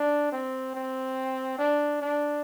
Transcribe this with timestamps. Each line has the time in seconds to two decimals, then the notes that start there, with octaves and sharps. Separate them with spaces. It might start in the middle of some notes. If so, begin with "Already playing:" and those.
Already playing: D4
0.32 C4
0.75 C4
1.59 D4
2.02 D4